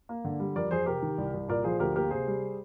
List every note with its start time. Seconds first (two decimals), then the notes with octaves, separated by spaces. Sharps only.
0.09 A#3
0.25 D3
0.40 G3
0.55 F2 A#4 D5
0.71 F2 G#4 C5
0.86 C3 G4 A#4
1.02 D#3
1.18 C2
1.34 C2
1.48 A#2 A#4 D5
1.64 F3 G#4 C5
1.79 D2 G4 A#4
1.95 A#3 G4 A#4
2.10 C3 G#4 C5
2.27 G3